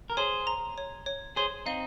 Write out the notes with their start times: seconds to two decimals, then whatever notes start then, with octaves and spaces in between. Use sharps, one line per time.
0.10 A#4
0.17 G#4 C5 C#5
0.47 A#5
0.78 C#5
1.06 C#5
1.36 G#4 C5 C#5
1.66 C4 D#4 F5